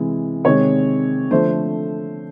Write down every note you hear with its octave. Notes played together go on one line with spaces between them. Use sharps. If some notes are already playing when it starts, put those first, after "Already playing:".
Already playing: C3 E3 G#3
C3 D#3 G#3 C#5
D3 F3 A3 C5